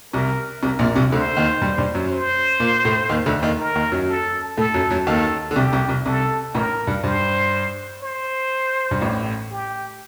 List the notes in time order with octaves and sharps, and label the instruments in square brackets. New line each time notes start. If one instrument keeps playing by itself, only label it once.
[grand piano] C2 C3 [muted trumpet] A#4
[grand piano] C2 C3 [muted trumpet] A#4
[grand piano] A#1 A#2
C2 C3
[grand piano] D2 D3 [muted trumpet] C5
[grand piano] D#2 D#3
G2 G3
G2 G3
F#2 F#3
[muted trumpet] C5
[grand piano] A#2 A#3
A2 A3
D#2 D#3
D2 D3
D#2 D#3
[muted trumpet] A#4
[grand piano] D#2 D#3
F#2 F#3
[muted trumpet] A4
[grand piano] A2 A3 [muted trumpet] A4
[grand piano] F#2 F#3
F#2 F#3
[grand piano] D#2 D#3 [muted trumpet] A4
[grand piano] D3
[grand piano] C2 C3 [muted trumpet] G4
[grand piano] C2 C3
C2 C3
[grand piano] C2 C3 [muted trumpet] A4
[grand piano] A1 A2 [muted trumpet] A#4
[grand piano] G2
[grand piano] G2 [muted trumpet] C5
[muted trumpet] C5
[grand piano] G2
A1 A2
[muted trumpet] G4